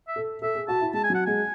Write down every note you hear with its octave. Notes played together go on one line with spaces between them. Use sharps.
E5
A4
A4 E5
G#4
F#4 A5
E4
G#3 A5
G#5
F#3 F#5
G#3 G#5